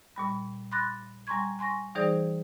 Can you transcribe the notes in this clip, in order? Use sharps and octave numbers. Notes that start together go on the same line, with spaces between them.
A#2 G3 B5
B5 C6 D6 F#6 A6 A#6
G3 G#5 A#5 C6 C#6 G#6
G#5 C6 C#6 A#6
E3 G3 D#4 G#4 C5 D5